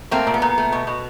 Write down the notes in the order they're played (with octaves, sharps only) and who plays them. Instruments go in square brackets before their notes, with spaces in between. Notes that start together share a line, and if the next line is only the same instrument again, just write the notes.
[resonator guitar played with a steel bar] A3 A#3 C4
A#2
B3
A#2
A3
B2
B2